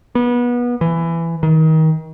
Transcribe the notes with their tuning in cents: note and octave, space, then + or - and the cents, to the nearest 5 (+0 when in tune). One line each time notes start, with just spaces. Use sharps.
B3 -25
E3 +15
D#3 +30